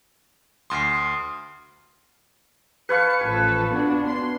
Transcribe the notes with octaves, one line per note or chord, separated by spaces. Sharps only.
D2 C6 D#6 F6 C7
B4 C#5 F5 A5 C#7
A1 F3 A4 G#5
B3 D4 F#4
C6